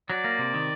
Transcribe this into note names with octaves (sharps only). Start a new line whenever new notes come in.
F#3 D5
A#3
C3
D#3